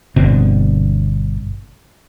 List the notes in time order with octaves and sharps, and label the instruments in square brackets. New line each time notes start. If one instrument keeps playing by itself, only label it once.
[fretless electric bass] G1 B2 D3 C4